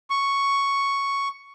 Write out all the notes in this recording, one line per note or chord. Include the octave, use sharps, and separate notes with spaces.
C#6